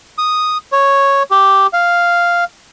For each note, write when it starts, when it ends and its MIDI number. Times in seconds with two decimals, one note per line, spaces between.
0.18 0.58 87
0.72 1.23 73
1.31 1.67 67
1.73 2.44 77